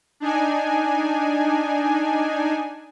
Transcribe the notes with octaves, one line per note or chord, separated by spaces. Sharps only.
D4 D#4 G#5